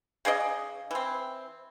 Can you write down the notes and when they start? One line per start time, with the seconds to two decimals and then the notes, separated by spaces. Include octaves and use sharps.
0.25 C#3 G#4 D5 D#5
0.91 E3 C4